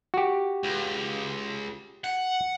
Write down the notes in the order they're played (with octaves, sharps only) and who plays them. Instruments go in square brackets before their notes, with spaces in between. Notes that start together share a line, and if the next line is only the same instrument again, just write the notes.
[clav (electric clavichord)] F#4 G4
[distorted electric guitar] C#2
F#5